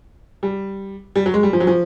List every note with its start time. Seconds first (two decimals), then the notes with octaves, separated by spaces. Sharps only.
0.43 G3
1.16 G3
1.26 F#3
1.34 G#3
1.43 G3
1.53 F3
1.60 F#3
1.67 F3